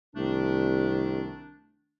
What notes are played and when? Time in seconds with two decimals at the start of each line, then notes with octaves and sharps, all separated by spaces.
0.16 C2 D#3 A3 D4